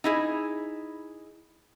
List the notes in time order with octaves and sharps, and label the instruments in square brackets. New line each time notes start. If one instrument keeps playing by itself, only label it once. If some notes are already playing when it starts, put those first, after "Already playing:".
[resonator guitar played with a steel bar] D#4 E4 G#4